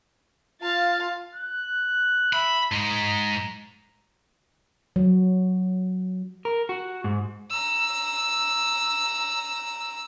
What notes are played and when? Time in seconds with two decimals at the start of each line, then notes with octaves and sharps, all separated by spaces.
0.61 F4 F5 A5
1.36 F#6
2.33 E5 B5
2.72 G#2 G#3 A#5
4.96 F#3
6.45 A#4
6.69 F#4
7.04 G#2
7.51 A#5 E6